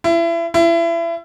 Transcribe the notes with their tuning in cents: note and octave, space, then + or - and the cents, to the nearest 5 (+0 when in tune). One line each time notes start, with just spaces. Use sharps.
E4 +30
E4 +30